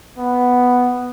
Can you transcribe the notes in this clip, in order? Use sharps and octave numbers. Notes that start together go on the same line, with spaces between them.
B3